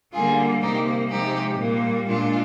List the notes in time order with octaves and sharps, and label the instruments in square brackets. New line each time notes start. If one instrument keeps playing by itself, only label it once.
[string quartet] D3 G3 A#3 F4 G#4
C3 G3 A#3 D#4 G4
C3 F3 G#3 D#4 G4
A#2 G3 A#3
A#2 G#3 D4 F4